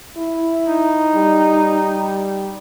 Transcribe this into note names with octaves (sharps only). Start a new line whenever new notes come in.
E4
D#4
G3